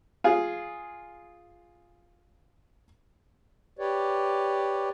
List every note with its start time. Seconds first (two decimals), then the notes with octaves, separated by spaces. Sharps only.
0.24 F4 G#4
3.79 G4 B4 C#5 D5